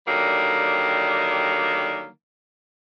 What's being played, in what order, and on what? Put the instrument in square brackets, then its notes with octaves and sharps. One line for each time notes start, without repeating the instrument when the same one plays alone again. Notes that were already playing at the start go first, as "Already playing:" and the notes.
[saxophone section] D3 D#3 F#3 G3 A#3